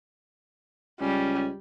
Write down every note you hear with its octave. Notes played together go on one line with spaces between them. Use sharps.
C#2 G3 C#4